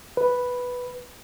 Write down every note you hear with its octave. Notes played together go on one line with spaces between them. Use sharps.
B4